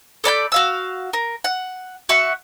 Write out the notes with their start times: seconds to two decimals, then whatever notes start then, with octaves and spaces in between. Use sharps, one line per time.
0.24 A4 D5 B5 G6
0.52 F#4 F5 E6
1.13 A#4
1.44 F#5
2.09 F#4 E5 F#5 C#6